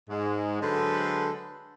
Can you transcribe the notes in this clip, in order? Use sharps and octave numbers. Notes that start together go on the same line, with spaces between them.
G#2 G#3
D3 F#3 G#3 A4 B4 C5